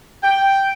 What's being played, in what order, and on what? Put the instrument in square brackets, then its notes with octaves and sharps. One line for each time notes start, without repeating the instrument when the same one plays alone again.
[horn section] G5